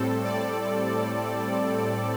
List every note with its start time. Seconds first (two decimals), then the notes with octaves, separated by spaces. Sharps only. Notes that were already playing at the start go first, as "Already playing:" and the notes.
Already playing: A2 G3 C4 A4
0.24 D5